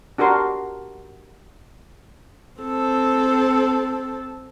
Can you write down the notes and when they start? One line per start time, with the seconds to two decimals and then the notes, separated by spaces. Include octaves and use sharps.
0.18 D4 F#4 G4 A#4 C6
2.61 C4 A4